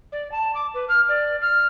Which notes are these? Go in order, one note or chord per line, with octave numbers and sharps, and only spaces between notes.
D5
A5
D6
B4
F6
D5
F6